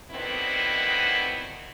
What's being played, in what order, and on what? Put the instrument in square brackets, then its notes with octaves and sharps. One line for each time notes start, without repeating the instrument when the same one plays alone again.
[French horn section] D3 D#3 F#3 B3 C4 E4